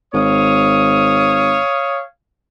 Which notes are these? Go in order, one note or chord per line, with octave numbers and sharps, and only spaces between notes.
G#1 C#5 F5 D#6